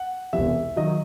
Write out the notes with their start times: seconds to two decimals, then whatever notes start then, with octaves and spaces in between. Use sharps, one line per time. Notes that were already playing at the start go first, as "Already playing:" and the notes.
Already playing: F#5
0.33 E1 E2 C3 E3 E5
0.76 D#3 F#3 D#5